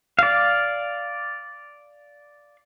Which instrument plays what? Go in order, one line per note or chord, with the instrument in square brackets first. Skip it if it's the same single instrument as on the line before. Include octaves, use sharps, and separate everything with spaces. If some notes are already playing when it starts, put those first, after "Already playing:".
[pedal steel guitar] D5 F5